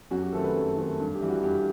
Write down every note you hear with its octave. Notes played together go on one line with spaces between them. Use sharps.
F#2 F#4
G4
D#3 A3 C4 A4
B4
F#2
D#3 A3 C4
G2
G4
E3 G3
F#4
G2 G4